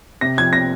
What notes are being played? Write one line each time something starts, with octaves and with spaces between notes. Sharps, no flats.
C3 A#6
F3 G#6
C3 A#6